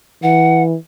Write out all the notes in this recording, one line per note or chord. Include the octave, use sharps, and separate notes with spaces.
E3 F#5